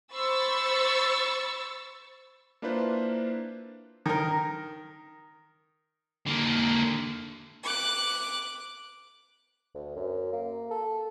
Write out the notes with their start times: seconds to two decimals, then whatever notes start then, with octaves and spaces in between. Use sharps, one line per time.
0.12 C5 B5 C#6 E6 A6
2.62 A#3 D4 E4 F4 B4 C5
4.06 D#3 A#4
6.26 D3 A#3
7.64 D6 F#6
9.75 D2
9.96 F#2
10.33 A#3
10.71 A4